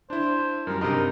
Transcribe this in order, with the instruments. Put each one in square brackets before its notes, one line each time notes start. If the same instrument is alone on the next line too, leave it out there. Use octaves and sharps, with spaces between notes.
[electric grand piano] D4 E4 [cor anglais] C5
[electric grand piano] F#2 G3 [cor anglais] A#4
[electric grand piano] G2 C3 [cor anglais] D#4 [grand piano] A#4